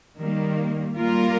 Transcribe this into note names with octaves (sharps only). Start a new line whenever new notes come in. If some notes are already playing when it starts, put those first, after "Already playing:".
D#3 G3 A#3
G3 A#3 F4 A#4